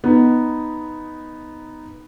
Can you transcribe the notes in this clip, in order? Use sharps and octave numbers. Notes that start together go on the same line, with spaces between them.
B3 D#4